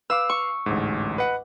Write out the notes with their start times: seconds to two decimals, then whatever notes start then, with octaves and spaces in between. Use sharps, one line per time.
0.10 B4 F5 D6 E6
0.29 C#6
0.66 A1 D2 G#2
1.18 B4 D#5 F#5